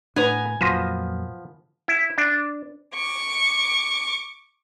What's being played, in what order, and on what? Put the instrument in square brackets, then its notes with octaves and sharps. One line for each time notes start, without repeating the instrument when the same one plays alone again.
[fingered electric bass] A2 [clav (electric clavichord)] B3 [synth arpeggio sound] D4 B4 [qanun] G#5 A#5
[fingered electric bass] F2 A#2 F#3 [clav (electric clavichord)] F3 B3 [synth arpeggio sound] C6 A#6 D#7
[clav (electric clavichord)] E4
D4
[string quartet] C#6 D6